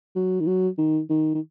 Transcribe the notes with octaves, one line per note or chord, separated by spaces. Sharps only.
F#3
D#3
F#3
D#3
D#3
D#3